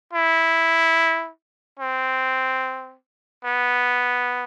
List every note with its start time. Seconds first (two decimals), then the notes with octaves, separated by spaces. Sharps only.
0.13 E4
1.80 C4
3.45 B3